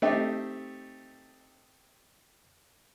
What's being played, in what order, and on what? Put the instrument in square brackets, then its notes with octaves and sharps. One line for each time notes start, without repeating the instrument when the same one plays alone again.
[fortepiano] A3 C4 D#4 G4